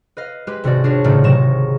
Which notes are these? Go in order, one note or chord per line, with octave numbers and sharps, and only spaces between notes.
B4 D#5 F5
G#3 G4 B4
G#1 C3 C#4 F#4 D5
D4 F4 F#4 G#4 C#5
G#1 A2 C#3 A3 D#4 D5
C3 F#3 C#6 A#6 E7